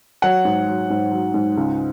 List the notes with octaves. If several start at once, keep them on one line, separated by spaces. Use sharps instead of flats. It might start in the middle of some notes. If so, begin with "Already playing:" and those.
F#3 F#5
G#2
F#3
G#2
F#3
G#2
C#2